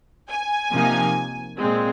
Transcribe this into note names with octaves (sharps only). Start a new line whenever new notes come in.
G#5
C3 F3 A#3 D#4
A#2 G#3 C4